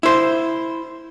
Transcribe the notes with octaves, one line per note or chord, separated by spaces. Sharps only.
E4 C5